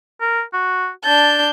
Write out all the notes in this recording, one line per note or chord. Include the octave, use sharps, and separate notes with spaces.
A#4
F#4
D4 A5 G6